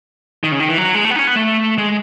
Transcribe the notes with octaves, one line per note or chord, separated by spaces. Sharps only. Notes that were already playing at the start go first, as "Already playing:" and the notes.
D#3
C#3
D#3
E3
F#3
G#3
A3
B3
D#4
C#4
B3
A3
G#3